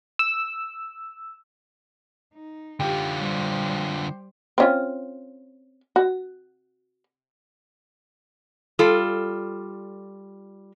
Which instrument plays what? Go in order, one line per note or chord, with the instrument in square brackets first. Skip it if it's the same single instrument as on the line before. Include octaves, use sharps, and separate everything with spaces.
[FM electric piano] E6
[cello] D#4
[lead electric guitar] D3 F4 [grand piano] G4
[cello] G3 C5
[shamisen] C4 C#4 F4
F#4
[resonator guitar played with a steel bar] G3 F4 A4